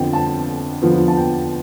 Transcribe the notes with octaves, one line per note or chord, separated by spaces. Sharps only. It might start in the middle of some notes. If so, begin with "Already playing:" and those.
Already playing: F2 D3 F3 B3 G5
A5
E2 D3 F3 B3
A5
G5